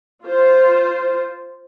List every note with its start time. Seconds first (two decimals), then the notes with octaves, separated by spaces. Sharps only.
0.24 F4 C5